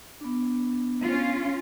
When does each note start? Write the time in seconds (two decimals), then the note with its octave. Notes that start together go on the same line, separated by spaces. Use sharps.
0.21 B3 D4
1.04 C#4 F4